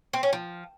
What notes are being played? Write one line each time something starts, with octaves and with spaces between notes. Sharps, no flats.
C4
C#4
F3